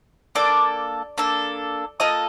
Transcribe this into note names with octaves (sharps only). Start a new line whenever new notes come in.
A#3 D4 A4 D5 D6
A#3 D4 A4
A#3 F4 A4 D#5 D#6